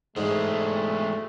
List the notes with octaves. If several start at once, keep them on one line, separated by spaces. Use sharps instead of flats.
G#2 E3 G#3 A3